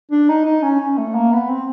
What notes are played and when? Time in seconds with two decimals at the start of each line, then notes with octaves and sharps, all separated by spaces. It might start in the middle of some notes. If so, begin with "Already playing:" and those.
0.11 D4
0.29 D#4
0.45 D#4
0.62 C#4
0.80 C#4
0.98 A3
1.15 A#3
1.32 B3
1.49 C4